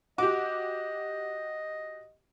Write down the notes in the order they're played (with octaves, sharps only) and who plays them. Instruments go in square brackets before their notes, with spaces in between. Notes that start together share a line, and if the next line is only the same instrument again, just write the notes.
[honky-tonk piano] F#4 G4 [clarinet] D#5 [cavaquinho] D6